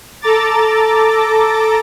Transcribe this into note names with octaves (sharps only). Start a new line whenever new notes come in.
A4 A#5 D6 A6